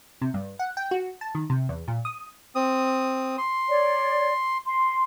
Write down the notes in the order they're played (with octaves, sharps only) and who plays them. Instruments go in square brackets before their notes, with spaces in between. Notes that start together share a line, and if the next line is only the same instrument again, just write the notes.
[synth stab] C3
G2
F#5
G5
F#4
A5
D#3
C3
E2
A#2
D#6
[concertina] C4 D#6
C6
[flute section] C#5 D5
C6